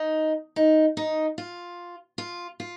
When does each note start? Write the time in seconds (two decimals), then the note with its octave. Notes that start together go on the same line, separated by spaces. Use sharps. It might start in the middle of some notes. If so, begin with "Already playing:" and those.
Already playing: D#4
0.56 D#4
0.97 D#4
1.38 F4
2.18 F4
2.60 F4